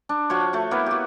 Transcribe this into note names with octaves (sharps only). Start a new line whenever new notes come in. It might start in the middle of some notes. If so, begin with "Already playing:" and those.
D4
F3 F#4 C#5
A3 F#4
A#3 B3 E4 B4
F#4 G4